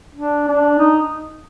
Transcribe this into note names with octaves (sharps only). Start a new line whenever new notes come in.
D4
D4
D#4